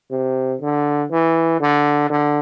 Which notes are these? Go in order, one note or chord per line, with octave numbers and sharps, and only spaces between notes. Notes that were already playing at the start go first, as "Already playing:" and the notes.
C3
D3
E3
D3
D3